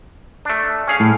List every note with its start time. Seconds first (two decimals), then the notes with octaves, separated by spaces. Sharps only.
0.45 A3 D4
0.87 C#4 G#4 F5
1.00 A2